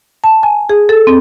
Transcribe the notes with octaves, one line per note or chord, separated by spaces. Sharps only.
A5
G#5
G#4
A4
C4